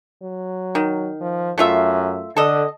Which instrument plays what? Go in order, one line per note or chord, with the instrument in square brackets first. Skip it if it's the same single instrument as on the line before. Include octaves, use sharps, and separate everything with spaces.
[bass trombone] F#3
[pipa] D#3
[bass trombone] F3
[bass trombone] F#2 [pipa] A3 F4 E5
[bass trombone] D3 [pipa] A4 D#5